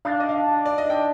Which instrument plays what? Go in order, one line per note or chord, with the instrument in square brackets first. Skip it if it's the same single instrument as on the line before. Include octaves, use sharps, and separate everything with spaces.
[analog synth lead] D4 [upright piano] F5
[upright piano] D#5
F5
D5
D#5
G5